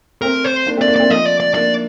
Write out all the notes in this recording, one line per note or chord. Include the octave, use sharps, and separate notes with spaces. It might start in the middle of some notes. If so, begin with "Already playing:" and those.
A3 C4 A#4
C5
A#3 D4
A3 C4 D5
A#3 D4
A3 C4 D5
F3 A3 D#5
D5
D5
A#3 D4 D5